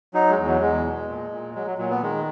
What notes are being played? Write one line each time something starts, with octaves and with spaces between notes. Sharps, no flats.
F#3 D#4
G#3
E2
F#3
E2 G#3
B2
A#2
A#2
F#3 G#3
F#3
A#2 F#3
B3
D#3 G#3